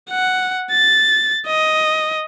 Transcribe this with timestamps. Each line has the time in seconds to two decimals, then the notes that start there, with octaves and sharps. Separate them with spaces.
0.11 F#5
0.71 A6
1.47 D#5